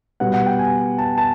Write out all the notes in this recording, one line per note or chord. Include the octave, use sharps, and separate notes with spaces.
B2 G3 B3 F#5
F#5
G5
G#5
A5
A5